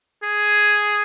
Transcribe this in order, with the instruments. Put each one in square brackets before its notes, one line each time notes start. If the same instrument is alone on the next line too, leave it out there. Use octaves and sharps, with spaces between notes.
[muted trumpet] G#4